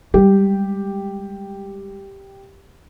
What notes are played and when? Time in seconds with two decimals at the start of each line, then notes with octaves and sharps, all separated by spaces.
0.14 G3 G#3 G4